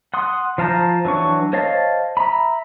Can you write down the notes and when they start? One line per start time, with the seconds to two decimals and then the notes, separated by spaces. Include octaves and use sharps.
0.14 F#5 C6 D#6
0.58 F3 F5 A5 A#5 G6
1.05 E3 F#3 D4 C#6
1.53 C5 C#5 D#5 F5 A5
2.17 E5 A#5 B5